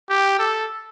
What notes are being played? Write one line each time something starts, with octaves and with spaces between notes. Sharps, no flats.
G4
A4